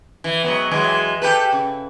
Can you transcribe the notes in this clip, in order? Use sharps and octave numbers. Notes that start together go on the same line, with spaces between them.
E3
G#2 F#3 B3
E3 F#3 G#3
G4 A4 B4
C#3